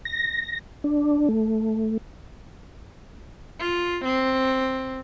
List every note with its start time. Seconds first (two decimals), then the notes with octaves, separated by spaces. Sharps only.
0.05 A#6
0.84 D4
1.28 A3
3.60 F4
4.04 C4